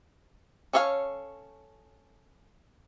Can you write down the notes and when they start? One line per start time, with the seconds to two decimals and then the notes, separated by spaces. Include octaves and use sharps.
0.73 C#4 A4 C#5 D#5 F5